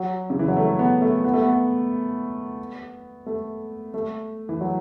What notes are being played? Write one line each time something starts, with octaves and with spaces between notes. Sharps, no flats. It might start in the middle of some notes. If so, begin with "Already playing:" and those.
Already playing: F#3
C#3
E3
F#3
A3
B3
A3
B3
A3
B3
A3
A3
E3
F#3